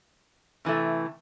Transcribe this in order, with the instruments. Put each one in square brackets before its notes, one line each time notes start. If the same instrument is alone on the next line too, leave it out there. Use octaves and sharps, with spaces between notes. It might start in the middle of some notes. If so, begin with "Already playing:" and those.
[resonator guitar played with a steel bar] C3 E3 A3